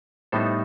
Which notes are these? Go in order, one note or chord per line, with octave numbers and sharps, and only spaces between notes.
A2 G3 B3 D#4 A4 C5